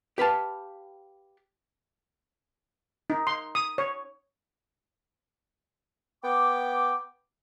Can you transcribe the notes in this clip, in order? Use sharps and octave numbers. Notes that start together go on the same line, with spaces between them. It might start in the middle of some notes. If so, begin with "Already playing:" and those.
G4 B4 F5 A5
D#4
C6
D#6
C#5
B3 G5 D6